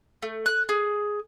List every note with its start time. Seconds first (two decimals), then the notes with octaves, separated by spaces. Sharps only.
0.22 A3
0.46 F#6
0.69 G#4